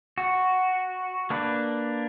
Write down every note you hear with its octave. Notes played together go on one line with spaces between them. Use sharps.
F#4
A#3 D4 B4